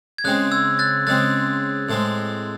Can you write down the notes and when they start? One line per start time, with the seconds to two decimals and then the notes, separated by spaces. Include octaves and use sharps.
0.18 G#6
0.24 C#3 G#3 C4 F#6
0.52 E6 G#6
0.79 F#6 A6
1.07 C#3 G#3 C4 F#6 A6
1.89 A2 G#3 C4